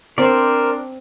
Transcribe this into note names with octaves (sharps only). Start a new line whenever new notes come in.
C4 D4 A#4 C5 D5